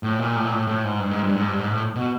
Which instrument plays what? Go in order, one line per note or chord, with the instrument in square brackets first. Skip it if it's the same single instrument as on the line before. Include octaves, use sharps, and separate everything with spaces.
[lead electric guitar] A2
A#2
A2
A#2
A2
A2
G#2
G2
G#2
G2
G#2
G2
G#2
A2
B2